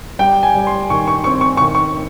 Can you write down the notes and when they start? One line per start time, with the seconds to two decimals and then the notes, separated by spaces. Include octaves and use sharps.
0.19 G3 G5
0.43 G#5
0.55 G3
0.67 C6
0.90 D#3 C#6
1.07 C#6
1.24 C4 C#6
1.41 C#6
1.57 C#6
1.62 D#3
1.75 C#6